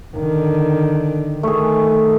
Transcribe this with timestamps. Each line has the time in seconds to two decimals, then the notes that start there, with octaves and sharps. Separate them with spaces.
0.17 D3 D#3
1.43 D#3 A3 G#4